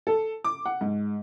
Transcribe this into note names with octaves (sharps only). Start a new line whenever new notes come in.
A4
D6
F#5
G#2